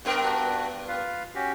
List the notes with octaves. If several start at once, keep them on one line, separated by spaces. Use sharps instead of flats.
G2 B3 A#4
D4 F#4 B4
F4 B4 F5
C#4 F#4 G4